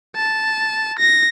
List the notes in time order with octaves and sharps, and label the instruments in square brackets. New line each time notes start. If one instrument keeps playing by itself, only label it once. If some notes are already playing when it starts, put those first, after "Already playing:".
[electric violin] A5
A#6